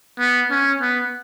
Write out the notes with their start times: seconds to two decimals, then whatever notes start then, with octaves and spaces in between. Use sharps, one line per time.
0.19 B3
0.51 C#4
0.81 B3